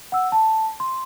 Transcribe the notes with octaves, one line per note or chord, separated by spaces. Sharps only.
F#5 E6
A5
C6